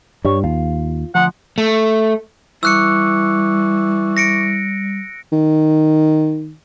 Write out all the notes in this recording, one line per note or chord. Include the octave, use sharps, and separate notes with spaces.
G2 G3 C#5
D#2 F4
D2 F3 F#5
A3
E3 G3 C#6 D6 E6 F#6 C#7
A#6 C#7 D7
D#3